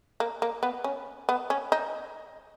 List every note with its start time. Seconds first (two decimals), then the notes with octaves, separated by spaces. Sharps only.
0.20 A#3
0.42 A#3
0.63 B3
0.84 C#4
1.29 B3
1.50 C#4
1.72 D#4